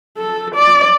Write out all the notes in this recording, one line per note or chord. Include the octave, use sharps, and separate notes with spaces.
A4
D5